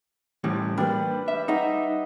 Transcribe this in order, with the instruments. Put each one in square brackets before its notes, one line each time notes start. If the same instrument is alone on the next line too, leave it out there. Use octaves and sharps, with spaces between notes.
[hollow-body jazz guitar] A2 E3 G3
[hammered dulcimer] G3 B4 [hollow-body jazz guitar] A#3 D4
[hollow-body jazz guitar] E5
[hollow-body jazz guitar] D#4 [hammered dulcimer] D#5 E5 F#5